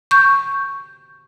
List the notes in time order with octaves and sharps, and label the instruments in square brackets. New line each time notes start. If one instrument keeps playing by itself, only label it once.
[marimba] C#6 G6